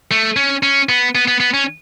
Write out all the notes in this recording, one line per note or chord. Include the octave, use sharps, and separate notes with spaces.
A3
C#4
C#4
B3
B3
B3
B3
C#4